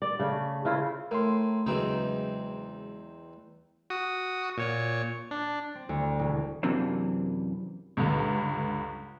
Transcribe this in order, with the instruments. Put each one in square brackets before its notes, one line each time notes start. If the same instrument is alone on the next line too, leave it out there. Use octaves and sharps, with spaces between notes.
[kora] D5
C#3 A3
C#3 E4 F4 C5
[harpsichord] A2 [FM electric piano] A#4 C6
[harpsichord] E2 C4 D#4 [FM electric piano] C#3 F#3 G#3
[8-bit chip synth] F#4 D#6
A#2 C#5 C#7
D4
[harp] C4
D2
E1
[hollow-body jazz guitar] F#2 C3 E3 A#3 C4 D4
[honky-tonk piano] C#2 G2 D3